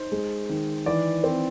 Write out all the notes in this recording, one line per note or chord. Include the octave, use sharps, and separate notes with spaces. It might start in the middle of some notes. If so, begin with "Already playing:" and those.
Already playing: D#4 C5
G#3
D#3
E3 D5
C4